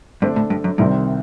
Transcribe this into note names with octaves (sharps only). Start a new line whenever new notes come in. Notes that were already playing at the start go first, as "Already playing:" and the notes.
G2 D3 A3 D4 A4 C5
A2
G2
F#2
C2 G2 C3 D#3 G3 C4